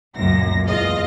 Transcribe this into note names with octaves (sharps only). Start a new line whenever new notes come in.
C#2 F#2 A#2 A#6
E2 G#3 F4 D#5 F5 A#6